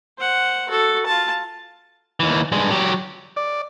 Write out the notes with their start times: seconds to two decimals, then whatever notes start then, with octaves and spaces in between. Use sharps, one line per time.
0.18 C5 F#5
0.69 F#4 A4
1.06 F4 A5
2.20 D#2 E3
2.52 G2 G#3
2.71 F#3 G4
3.36 D5